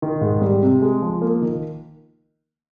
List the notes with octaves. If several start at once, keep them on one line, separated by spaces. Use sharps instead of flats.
D#3
G#2
G3
C3
G#3
F3
A#3
D#3